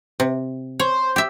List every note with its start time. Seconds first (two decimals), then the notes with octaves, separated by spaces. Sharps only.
0.20 C3
0.80 C5 C#5
1.16 G4 E5